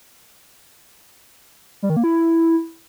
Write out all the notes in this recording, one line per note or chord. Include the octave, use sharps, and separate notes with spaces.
G3
D#3
A#3
E4